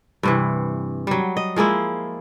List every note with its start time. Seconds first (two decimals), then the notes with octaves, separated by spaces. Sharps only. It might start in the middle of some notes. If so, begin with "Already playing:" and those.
0.23 G2 C3 E3
1.07 F#3 G3
1.37 D#5
1.56 F3 G#3 A#3 E4